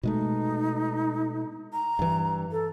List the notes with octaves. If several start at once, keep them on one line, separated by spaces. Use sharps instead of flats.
B2 G#3 A3 D#4
A#5
G2 E3
A4